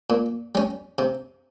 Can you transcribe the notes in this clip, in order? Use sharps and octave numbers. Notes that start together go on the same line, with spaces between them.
A#2
G3 C#4
C3